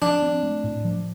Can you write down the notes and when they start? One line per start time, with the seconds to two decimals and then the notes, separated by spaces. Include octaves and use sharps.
0.02 F3 D4
0.22 C4
0.43 A3
0.64 A2
0.85 F3